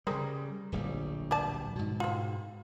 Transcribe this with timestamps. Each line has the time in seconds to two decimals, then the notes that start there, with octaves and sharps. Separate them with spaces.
0.07 C#3 G3 C4 G#4 A#4
0.72 D1 A#1 G3
1.31 G4 D5 A5
1.76 G#2 B2
2.00 C4 F4